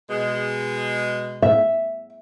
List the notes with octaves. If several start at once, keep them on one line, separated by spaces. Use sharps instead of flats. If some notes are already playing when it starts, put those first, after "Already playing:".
B2 G#3
E5